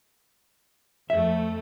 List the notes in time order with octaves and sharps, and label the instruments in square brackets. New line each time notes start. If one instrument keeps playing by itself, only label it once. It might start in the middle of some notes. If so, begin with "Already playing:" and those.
[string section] F2 A3 [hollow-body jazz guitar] E5